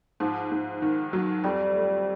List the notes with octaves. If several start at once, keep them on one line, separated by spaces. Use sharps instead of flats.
G#2 F3
G#2
D#3
F#3
F2 G3
A3